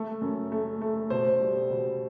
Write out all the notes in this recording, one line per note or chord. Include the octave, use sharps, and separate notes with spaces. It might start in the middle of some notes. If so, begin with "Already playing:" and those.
Already playing: A3
F#2
A3
A3
B2 C5
G3
B2